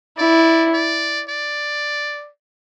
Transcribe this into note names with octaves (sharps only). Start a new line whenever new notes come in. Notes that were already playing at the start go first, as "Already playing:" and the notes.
E4 D5
D5
D5